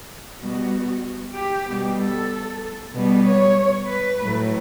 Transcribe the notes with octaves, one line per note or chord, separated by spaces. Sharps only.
B2 G3 B3 F#4
G4
B2 G3 B3
A4
B2 G3 B3
C#5
B4
A2 F#3 A3